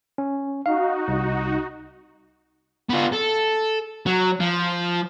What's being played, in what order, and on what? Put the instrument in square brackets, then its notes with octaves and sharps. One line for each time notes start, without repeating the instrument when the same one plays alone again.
[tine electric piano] C#4
[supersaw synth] D#4 F#4 [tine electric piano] F5
[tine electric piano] C2
[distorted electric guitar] B3 F4
A4
F#3
F3